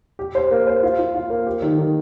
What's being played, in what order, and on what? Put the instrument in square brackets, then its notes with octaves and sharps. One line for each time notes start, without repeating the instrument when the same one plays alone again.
[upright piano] G4
C5
A#3
C5
F4
F4
F4
A#3
G4
D#3
D#3